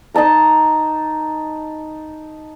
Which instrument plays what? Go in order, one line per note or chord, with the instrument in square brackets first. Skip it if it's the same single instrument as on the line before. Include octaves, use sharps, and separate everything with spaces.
[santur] D#4 D#5 A5 A#5